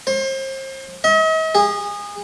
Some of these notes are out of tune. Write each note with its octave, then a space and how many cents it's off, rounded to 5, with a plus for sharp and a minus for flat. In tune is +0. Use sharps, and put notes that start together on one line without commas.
C5 +35
D#5 +45
G#4 -25